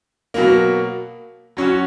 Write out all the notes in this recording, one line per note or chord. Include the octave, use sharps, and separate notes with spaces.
B2 F#3 A#3
F#3 C#4 F#4